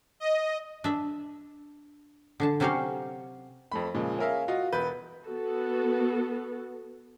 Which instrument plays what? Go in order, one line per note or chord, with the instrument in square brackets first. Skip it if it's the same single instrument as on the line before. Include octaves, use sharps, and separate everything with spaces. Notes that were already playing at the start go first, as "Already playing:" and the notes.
[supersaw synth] D#5
[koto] D4 E5
D3 D4 A5
C3 F#3 C#4 G4 C#5 F5
[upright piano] F2 A3 B5
A#2 C#3 F3 G#3
C#4 G#4 A#4 E5 F5
F4 F#4 D#5 F5
E1 B4 G6
[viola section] B3 F#4 A4